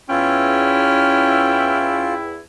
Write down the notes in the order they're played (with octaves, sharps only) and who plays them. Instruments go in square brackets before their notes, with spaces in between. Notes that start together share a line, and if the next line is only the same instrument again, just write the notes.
[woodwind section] E2 E4 [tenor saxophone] C#4 [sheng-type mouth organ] F4 [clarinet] G5